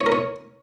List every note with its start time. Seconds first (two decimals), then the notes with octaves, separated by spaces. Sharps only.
0.01 C#5
0.06 A#4
0.12 C#5